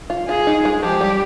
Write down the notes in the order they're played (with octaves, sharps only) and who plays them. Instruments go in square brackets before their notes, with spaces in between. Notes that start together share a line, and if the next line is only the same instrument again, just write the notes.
[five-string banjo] F4
[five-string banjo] F4 [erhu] G#4
[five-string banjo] D#4
G#3
[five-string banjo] F3 [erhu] G4
[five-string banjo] G3